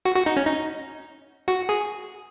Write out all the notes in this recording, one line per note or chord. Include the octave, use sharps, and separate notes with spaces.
F#4
F#4
D#4
C#4
D#4
F#4
G#4